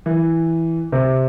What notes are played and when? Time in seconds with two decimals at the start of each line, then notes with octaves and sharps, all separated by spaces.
0.06 E3
0.92 C3